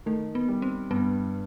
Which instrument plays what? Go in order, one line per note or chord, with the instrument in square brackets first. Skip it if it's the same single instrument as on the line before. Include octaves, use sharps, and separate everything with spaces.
[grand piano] D#3 [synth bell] A3
[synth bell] B3
[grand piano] G3
[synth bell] C4
[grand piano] G2 [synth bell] B3